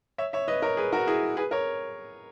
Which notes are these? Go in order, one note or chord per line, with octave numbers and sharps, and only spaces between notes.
C#5 E5
C#5 E5
B4 D#5
A#4 C#5
G#4 B4
F#4 A#4
E4 G#4
G#4 B4
A#4 C#5